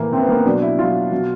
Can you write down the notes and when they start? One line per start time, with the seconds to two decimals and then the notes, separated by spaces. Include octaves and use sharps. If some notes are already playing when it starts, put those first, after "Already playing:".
Already playing: A2 E3 A#3
0.12 A2 E3 C4
0.21 B3
0.29 A#3
0.37 B3
0.45 B2 F#3 D4
0.62 E4
0.78 B2 F#3 F4
1.12 B2 F#3